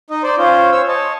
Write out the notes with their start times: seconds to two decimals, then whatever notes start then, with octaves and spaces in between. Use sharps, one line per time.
0.10 D#4 D#5
0.23 C5 D5
0.38 C#4 F4 C5
0.72 C5 C#5 E6
0.88 C#5 D#5 A5